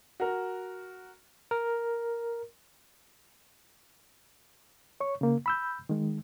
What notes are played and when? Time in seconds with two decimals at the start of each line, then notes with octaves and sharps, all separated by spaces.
0.20 F#4 A#4
1.51 A#4
5.00 C#5 C#6
5.21 C#3 A#3
5.46 B5 E6 G6
5.89 D#3 G#3